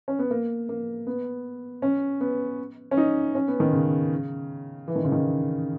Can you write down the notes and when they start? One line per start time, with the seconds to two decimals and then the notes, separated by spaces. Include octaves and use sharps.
0.08 C#4
0.19 B3
0.31 A#3
0.69 A#3
1.07 B3
1.82 C#4
2.20 B3
2.91 C#4
2.97 D#4
3.35 C#4
3.48 B3
3.60 D#3
3.73 C#3
4.88 E3
4.96 D#3
5.04 C#3
5.12 D#3